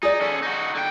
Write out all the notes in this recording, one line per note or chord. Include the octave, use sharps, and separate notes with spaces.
D#4 G#4 D5
C#4 A4
D#4 F#4
D3 G5